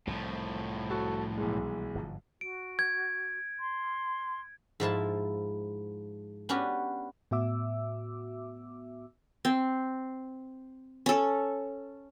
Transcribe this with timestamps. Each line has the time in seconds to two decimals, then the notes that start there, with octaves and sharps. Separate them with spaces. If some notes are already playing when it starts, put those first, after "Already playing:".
0.07 C2 A2 F3
0.90 F#4 A4
1.37 B1 E3 G#3
1.95 G1 G#2 F3
2.41 F#4 D7
2.79 G#6
3.60 C6
4.80 G#2 F3 E4 A5
6.49 B3 C#4 D4 F#4 G4
7.31 A2 B3 F#4 E5 D6 E6
9.45 C4
11.06 C#4 A4